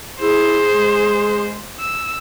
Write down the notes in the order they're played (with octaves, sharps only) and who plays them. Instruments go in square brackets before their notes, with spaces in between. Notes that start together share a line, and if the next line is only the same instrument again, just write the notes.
[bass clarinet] E4 [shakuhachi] G#4 [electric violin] C5
[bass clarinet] G#3
[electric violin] E6